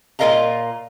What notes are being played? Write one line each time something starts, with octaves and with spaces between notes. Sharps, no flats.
A#2 F4 A#4 D#5 F5 A#5